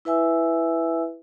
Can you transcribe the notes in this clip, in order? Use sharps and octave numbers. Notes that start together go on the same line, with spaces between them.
E4 B4 E5 G#5 E6